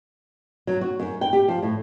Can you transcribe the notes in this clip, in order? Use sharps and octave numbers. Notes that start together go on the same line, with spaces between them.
F#3
F#4
F#2
G5
G4
F3
A2